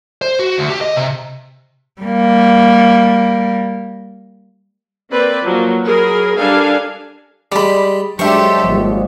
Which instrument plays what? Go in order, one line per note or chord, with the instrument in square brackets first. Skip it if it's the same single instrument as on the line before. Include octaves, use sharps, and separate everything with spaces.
[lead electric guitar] C5
F#4
D2
G4
D#5
C3
[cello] G3 A#3
[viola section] A#3 C4 B4 D5
F3 F#3 A#3
F#3 G#4 A#4 B5
G3 D4 A4 A#4 F5 G#5
[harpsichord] G3 G#3 [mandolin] D5 B5
[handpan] F#3 G#3 [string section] D4 G4 A4 [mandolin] C5 E5 [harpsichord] C#6
[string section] G#1 [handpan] F3 G3 A#3